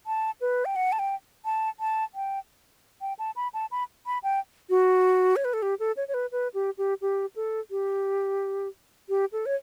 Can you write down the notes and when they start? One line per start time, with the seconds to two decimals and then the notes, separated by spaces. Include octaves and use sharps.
0.07 A5
0.41 B4
0.65 G5
0.76 F#5
0.92 A5
0.99 G5
1.45 A5
1.80 A5
2.15 G5
3.01 G5
3.19 A5
3.36 B5
3.54 A5
3.71 B5
4.06 B5
4.23 G5
4.70 F#4
5.36 C#5
5.45 B4
5.53 A4
5.62 G4
5.80 A4
5.97 C#5
6.08 C#5
6.14 B4
6.32 B4
6.54 G4
6.78 G4
7.02 G4
7.36 A4
7.71 G4
9.09 G4
9.32 A4
9.46 C#5